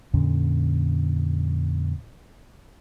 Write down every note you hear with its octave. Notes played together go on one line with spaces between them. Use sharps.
F2 A#2 D3 C#4